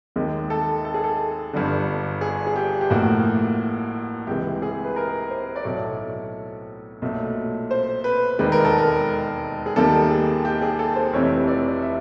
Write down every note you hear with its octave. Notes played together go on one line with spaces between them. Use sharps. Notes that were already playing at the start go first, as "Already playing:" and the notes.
D#2 D#3 G#3
A4
A4
G#4
A4
G1 G2 D3
G#4
G#4
G4
G4
A1 A2 F3 A#3 F#4
C#2 C3 E3 G#3 G4
G#4
B4
A#4
C5
D5
B1 A2 F#3 A3 C#5
B1 A#2 F#3 A3
C5
B4
E1 D#2 D#3 G#3 B4
A#4
A4
A#4
G#4
D#2 D#3 G3 A#3 A4
G#4
G4
G#4
A4
C5
F1 F2 C3 E3 C#5
D5
E5